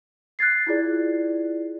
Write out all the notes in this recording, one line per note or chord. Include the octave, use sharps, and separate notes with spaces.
F#6 G#6 A6 C7
E4 F4 G#4 D5